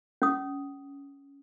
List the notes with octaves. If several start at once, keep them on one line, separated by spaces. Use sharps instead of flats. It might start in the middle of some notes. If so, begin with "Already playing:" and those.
C#4 D#6